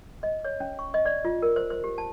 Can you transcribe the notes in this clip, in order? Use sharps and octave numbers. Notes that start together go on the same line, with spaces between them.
D#5
C#5
C#4
C#6
D#5
D5
F4
A#4
C5
C5
G4
A5